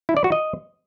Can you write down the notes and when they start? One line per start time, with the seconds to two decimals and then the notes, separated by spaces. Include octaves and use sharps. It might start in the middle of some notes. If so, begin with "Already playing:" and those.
0.09 E4
0.17 D5
0.24 F#4
0.32 D#5